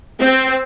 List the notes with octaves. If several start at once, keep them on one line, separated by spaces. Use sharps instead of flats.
C4